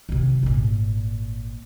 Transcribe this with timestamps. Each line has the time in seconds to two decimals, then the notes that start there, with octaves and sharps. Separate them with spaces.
0.09 C3 D#3
0.43 G#1 A#2